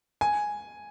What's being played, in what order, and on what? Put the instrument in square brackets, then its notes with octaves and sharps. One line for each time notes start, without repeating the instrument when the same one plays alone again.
[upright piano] G#5